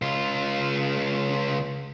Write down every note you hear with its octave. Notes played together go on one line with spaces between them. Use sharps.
C#2 F4